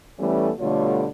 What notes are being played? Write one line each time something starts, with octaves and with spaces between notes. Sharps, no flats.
E3 G3 A3 B3 C#4 A4
B2 D3 G3 A3 F4 C#5